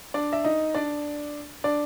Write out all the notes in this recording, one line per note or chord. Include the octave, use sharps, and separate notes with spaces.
D4 D5
E5
D#4 D#5
D4 D5
D4 D5